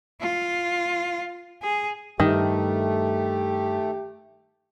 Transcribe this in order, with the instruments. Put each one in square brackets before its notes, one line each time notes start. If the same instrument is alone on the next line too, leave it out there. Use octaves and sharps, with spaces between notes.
[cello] F4
G#4
[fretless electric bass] G2 [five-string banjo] D#3 [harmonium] A3 [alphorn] G4